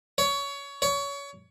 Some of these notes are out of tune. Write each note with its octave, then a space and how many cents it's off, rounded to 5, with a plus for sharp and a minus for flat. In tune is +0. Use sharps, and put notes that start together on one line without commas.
C#5 +20
C#5 +25